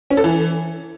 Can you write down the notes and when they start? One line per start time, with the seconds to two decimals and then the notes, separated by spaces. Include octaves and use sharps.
0.10 C#4
0.17 A4
0.24 E3